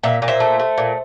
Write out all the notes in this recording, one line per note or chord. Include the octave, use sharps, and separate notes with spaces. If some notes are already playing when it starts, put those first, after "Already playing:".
A#2 E5
A#2
C5 E5
A3
A3
A#2